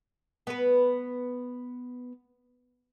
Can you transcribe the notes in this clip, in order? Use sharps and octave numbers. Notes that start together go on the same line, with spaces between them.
B3 B4